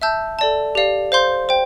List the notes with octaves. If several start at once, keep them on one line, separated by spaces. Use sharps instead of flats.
E5 A5 E6 G6
A4 D5 A5
G4 D5 F5
C5 F5 C6 G6
C5 G5